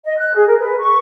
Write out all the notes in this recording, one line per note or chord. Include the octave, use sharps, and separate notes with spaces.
D#5
F#6
G#4
A#4
B4
C#6